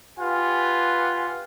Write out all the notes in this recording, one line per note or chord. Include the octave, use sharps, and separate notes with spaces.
F4 G4 B4 F#5 G#5